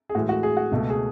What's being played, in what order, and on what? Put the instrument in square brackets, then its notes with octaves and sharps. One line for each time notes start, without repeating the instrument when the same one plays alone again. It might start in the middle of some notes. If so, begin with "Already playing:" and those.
[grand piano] G#4
A2 E3 G#3 F#4
F#4
G#4
F#4
C#2 B2 A3
G#4